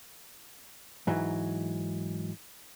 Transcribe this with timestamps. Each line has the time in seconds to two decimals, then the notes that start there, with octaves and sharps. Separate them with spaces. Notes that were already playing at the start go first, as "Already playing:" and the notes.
1.07 G#2 E3 F#3